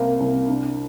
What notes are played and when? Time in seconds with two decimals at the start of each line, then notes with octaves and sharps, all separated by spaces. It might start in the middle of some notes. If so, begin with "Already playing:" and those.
Already playing: C2 C3 A#3
0.20 C2
0.48 D4